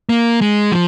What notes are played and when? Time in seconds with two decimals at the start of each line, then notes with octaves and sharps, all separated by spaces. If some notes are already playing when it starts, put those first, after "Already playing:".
0.09 A#3
0.41 G#3
0.72 F3